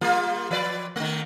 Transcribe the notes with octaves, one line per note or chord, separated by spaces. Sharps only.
G3 A#3 F4
F3 B4 D5
D#3 A3